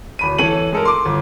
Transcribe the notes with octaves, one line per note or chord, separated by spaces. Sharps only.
D1 B5 D#7
E3 A4 C#5 D#7 F#7
G#3 A4 A#4
C6 D6
G1